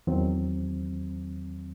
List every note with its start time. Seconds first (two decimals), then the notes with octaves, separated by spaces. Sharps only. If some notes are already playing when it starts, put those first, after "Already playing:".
0.07 E2 D#3 F#3 C4